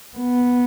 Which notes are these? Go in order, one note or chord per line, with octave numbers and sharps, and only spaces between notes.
B3